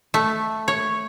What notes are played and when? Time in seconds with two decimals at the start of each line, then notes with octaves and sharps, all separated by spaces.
0.14 A3
0.68 C#5